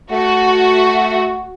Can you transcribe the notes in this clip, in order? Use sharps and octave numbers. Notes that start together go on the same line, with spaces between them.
A3 F#4